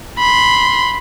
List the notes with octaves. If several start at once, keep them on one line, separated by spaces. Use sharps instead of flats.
B5 C6